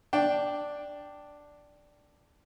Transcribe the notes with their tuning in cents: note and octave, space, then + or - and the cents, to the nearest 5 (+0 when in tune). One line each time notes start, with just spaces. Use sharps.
D4 +0 G5 +0